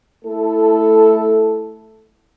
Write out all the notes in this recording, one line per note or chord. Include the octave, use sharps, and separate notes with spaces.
A3 E4 A4